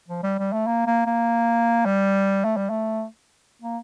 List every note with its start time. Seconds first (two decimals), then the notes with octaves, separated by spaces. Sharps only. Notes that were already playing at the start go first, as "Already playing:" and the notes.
0.09 F3
0.23 G3
0.39 G3
0.53 A3
0.67 A#3
0.87 A#3
1.06 A#3
1.86 G3
2.45 A3
2.56 G3
2.70 A3
3.62 A#3